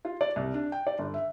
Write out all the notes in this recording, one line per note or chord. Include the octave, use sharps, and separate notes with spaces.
F4
D5
C2
D4
G5
D5
G1
E5